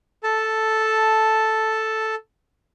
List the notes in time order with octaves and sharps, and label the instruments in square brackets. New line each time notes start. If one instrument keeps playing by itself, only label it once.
[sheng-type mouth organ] A4 A5